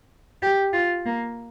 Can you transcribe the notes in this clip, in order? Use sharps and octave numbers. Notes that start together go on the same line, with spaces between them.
G4
F4
A#3